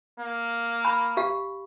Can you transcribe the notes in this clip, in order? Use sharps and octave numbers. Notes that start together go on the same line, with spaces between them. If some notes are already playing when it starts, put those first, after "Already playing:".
A#3
B5
G4 F5